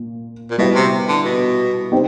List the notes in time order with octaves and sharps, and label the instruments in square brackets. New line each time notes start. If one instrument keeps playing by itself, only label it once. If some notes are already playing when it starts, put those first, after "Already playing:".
Already playing: [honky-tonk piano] A#2 A#3
[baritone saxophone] A#2
[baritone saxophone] B2 [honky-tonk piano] G3 B3 E4 G4 B4
[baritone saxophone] C3
D3
B2
[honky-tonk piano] C4 D#4 G4